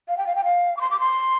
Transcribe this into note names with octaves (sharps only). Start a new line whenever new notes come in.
F5
G5
F5
G5
F5
D6
C6
D6
C6